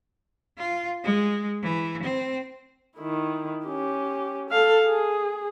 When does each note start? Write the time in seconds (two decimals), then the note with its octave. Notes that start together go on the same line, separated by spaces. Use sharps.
0.58 F4
1.04 G#3
1.63 E3
2.03 C4
2.97 D#3 E4
3.67 C#4 G4
4.51 A4 F5
4.86 G#4